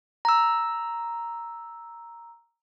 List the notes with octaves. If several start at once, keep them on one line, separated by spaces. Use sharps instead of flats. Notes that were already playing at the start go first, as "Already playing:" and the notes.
A#5 E6